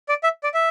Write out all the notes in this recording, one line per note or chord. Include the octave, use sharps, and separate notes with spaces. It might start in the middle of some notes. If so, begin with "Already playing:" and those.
D5
E5
D5
E5